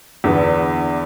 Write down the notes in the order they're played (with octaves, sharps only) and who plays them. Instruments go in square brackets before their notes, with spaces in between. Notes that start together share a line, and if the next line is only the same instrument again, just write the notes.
[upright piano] E2 D3 B3